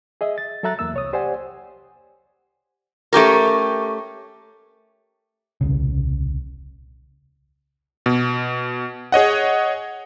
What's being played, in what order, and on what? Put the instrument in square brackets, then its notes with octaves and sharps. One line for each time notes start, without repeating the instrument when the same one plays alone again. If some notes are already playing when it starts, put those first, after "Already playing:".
[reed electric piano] G#4 D#5 E5
A6
F#3 A4 E5 A#5 F#6 A6
E2 A#3 E6
C2 C#5 D#6
G4 C5 D5 F#5 G#5
[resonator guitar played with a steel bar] A3 C#4 G4 A#4
[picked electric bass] D#1 C2 C#3
[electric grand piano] B2
G#4 C#5 D#5 F#5